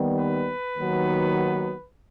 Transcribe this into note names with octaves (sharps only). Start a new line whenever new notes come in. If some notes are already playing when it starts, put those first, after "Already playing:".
Already playing: D#2 D#3 G3 B3
B4
D#2 D#3 F#3 B3